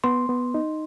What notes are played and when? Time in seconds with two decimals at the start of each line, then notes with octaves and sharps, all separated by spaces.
0.04 B3 C6
0.29 B3
0.54 D#4